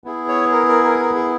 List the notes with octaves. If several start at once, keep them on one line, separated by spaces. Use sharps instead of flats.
B3 E4 G#4
C#5
A#4
A#4
A#4
A#4
G#4